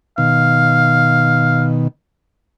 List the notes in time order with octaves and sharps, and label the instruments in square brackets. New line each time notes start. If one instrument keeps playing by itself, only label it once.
[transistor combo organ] B2 D#3 [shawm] F5